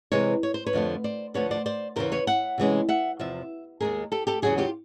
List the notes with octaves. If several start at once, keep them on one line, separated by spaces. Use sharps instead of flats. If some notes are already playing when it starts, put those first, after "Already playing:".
C3 E3 G#3 B4 C#5
C#5
C5
B4 C#5
F2 D3 F3 A3
C5 D5
D2 D3 F3 A3 B4 C#5
C5 D5
C5 D5
E2 C#3 E3 A#4 C5
B4 C#5
E5 F#5
C3 E3 G#3 C#4
E5 F#5
E2 C3 F3 E5
D#2 D#3 G#3 G#4 A#4
G4 A4
G4 A4
E2 C#3 F#3 F#4 G#4
F4 G4